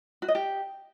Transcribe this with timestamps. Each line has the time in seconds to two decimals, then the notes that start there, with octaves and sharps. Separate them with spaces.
0.22 F#4
0.28 D#5
0.35 G4